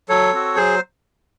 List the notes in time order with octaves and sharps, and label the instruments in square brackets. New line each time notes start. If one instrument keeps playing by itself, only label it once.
[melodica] F#3 A4 C#5
C4 F#4
F#3 G#4 C5